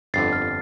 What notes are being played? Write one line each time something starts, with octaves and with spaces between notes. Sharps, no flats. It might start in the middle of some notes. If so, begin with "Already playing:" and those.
G1 F2 D3 A6 C7
F6